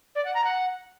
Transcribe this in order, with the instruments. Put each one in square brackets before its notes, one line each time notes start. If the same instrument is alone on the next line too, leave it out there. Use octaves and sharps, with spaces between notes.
[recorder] D5
F#5
A#5
F#5